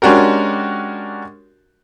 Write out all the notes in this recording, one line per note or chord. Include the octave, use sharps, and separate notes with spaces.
G#3 C#4 D4 F#4 G4 A#4